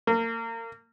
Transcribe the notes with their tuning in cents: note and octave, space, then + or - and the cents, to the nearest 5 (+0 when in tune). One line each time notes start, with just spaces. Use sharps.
A#3 -30